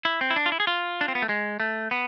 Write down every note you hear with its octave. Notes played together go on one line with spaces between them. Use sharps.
E4
C4
E4
D4
F4
E4
G#4
F4
D4
C4
B3
A3
G#3
A3
B3